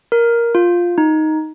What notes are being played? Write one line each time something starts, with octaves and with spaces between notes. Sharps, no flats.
A#4
F4
D#4